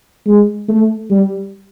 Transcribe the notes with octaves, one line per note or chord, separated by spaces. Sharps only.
G#3
A3
G3